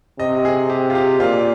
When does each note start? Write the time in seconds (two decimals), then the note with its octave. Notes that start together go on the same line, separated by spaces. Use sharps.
0.19 C3 D#5
0.45 G#4
0.70 G4
0.90 F4
0.95 G4
1.20 A#2 F4